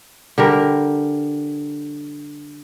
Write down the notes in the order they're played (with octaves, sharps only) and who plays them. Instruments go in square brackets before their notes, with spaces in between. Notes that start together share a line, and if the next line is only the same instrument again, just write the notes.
[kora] D3 G3 A#4